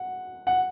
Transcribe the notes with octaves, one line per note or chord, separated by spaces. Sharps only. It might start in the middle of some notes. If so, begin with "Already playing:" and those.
Already playing: F#5
F#5